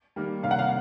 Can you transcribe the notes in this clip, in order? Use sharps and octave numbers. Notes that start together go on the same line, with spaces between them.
D#3 G3 A#3
C3 F5
F#5
F5